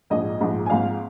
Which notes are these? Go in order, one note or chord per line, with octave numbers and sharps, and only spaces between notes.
A#1 G#2 F3 D#5
A#1 G#2 F3
G#5
G#1 G#2 F3 F5